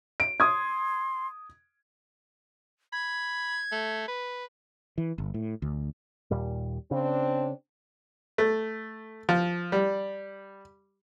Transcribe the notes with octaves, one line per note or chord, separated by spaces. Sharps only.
D7
C6 D#6 G#6
B5 G#6
A3
B4
E3
G1
A2
D2
D#2 A#2 G3
C#3 C4 D4
A3
F3
G3